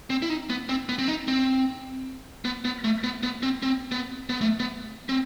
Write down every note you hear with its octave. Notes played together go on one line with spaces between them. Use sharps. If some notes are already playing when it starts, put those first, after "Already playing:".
C4
E4
D#4
B3
C4
B3
C4
D#4
C4
B3
B3
A3
B3
B3
C4
C4
B3
B3
A3
B3
C4